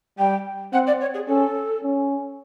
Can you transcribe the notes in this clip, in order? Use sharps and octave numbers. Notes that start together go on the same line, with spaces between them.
G3 G5
C4 F#5
D5
C#5
G#4
C#4 A4
C#4